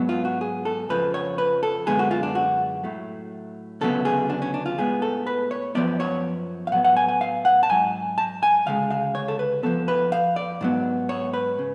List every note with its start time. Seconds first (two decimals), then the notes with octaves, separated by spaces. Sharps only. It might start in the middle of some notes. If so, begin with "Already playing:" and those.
Already playing: G#2 F#3 B3
0.09 F4
0.25 F#4
0.41 G#4
0.65 A4
0.89 F2 C#3 F3 B4
1.14 C#5
1.38 B4
1.63 A4
1.87 F#2 D3 G#3 B3 G#4
1.99 F#4
2.11 F4
2.23 D4
2.35 F#4
2.84 A2 F#3 A3
3.81 D2 C#3 F#3 B3 A4
4.05 G#4
4.30 D4
4.42 C#4
4.54 D4
4.66 F4
4.78 A2 G#3 B3 G#4
5.02 A4
5.27 B4
5.51 C#5
5.75 F#2 F3 B3 D5
6.00 C#5
6.67 F5
6.72 A2 F#3 B3 F#5
6.84 F#5
6.97 G#5
7.09 G#5
7.21 F5
7.45 F#5
7.63 A5
7.69 G#2 F#3 G#5
8.18 A5
8.43 G#5
8.66 D2 C#3 G#3 F5
8.90 F5
9.15 C#5
9.28 A4
9.39 B4
9.63 F2 F3 G#3 B3 A4
9.88 B4
10.12 F5
10.36 D5
10.61 G#2 F#3 B3
11.09 C#5
11.33 B4
11.59 C#3